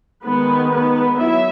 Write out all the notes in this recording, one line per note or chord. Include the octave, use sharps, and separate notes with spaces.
D#3 G#3 B3 D#4 B4
B3 B4
F#3 E4 E5